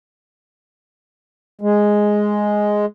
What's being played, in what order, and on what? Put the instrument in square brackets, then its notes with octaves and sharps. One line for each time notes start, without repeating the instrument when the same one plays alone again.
[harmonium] G#3